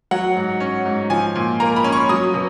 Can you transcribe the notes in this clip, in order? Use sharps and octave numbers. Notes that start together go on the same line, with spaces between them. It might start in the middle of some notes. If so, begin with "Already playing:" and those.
F#3 F#5
G#2
C#4
G#2
F3 G#5
A#2
A#3 A#5
B5
C#4
C#6
F#3 D#6
B2